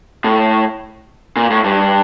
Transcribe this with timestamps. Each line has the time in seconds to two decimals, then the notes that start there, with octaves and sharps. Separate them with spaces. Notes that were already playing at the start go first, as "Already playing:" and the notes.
0.24 A2
1.36 A#2
1.50 A2
1.64 G2